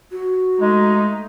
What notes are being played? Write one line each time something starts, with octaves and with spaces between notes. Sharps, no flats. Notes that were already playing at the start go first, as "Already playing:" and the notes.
F#4
G#3 A3 D#4